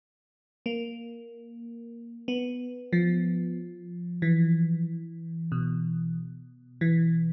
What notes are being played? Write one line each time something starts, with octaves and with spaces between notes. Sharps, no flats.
A#3
B3
F3
E3
B2
E3